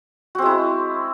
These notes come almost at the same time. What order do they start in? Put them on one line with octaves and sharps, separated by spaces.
F#4 C4 G#3 E4